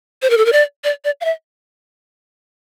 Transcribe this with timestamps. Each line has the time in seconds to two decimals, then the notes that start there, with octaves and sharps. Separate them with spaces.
0.22 C5
0.30 A#4
0.37 A4
0.45 A#4
0.53 D5
0.84 D5
1.05 D5
1.21 F5
1.25 E5